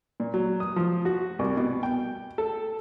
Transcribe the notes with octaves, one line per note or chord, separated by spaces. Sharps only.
A#2
F#3
D#6
F3
F#4
C2
B2
G5
A4